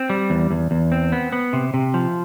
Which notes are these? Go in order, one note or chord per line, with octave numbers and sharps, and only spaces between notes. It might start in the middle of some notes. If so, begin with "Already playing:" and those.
Already playing: C4
G3
E2
E2
E2
C4
B3
B3
C3
C3
F3